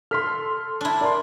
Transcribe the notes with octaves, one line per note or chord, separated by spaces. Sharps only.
A4 C6 F6 B6
D4 E4
A#4 D5 A5 C6